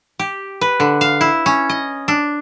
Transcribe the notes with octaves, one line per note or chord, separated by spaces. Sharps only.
G4
B4
D3
F5
E4
C#4
D#5
D4